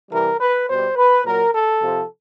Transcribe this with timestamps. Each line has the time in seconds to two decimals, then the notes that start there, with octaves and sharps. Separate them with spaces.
0.11 C3 E3 G3 A#4
0.39 B4
0.68 B2 G3 C5
0.96 B4
1.25 A#2 F#3 A#4
1.53 A4
1.82 C3 F3